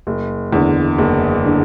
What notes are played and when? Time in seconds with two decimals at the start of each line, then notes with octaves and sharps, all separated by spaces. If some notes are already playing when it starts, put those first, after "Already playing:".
0.07 F#1
0.53 E2 D3
0.98 F#1
1.46 D3